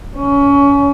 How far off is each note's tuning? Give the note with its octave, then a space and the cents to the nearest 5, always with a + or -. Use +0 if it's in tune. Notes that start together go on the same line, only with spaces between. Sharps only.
C#4 +25